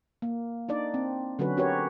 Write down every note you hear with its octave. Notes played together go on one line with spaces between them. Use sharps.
A#3
D4 D#4 D5
C4
D3 F#3 C#4 F#4 B4
C#4 F#4 G4 A#4 B4 C#5